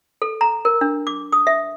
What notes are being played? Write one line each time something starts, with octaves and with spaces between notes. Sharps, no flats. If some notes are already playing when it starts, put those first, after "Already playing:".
A4
A#5
A#4
D4
D6
D#6
E5